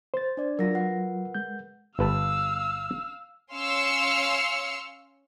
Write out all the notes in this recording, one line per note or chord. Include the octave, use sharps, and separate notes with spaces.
C5 A6
D4 D5
F#3 F4 A#4 F#5 A#6
A#4 B4 F#5
G#3 G6
G1 B4 F5 A5 E6
C#4 F5 C6 E6 F6 C#7